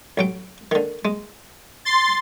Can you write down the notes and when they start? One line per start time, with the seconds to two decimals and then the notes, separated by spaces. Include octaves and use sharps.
0.17 A1 F#3 G5
0.71 D3 D#3
1.05 G#3
1.85 C6 A6